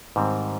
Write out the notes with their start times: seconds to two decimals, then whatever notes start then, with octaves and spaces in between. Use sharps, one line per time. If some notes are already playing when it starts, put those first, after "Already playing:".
0.16 G#2 D#3 G3 C4